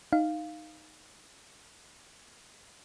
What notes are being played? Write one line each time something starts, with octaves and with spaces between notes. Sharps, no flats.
D#4 F5